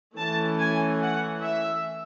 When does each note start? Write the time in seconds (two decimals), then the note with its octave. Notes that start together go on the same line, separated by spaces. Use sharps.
0.16 E3 A3 C#4 A5
0.59 G#5
1.02 F#5
1.44 E5